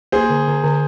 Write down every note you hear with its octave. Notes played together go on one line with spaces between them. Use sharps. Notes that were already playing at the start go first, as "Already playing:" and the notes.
A#3 G#4 C5
D3
D3
D3